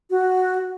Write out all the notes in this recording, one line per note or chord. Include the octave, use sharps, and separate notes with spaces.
F#4